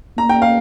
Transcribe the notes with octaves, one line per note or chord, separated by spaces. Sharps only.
A#3 A#5
G5
F5